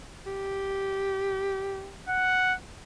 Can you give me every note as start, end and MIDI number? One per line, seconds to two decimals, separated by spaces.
0.26 1.93 67
2.09 2.54 78